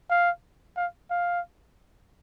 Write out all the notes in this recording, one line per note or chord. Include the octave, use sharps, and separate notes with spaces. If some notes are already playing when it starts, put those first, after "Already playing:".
F5
F5
F5